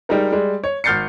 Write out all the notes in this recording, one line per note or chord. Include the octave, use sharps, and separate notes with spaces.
G3 G#3 D#4 A#4
G3 G#3
C#5
G#1 F6 G6 A6 C7 C#7